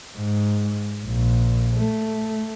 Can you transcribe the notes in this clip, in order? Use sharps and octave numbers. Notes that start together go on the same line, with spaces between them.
G#2
A#1
A3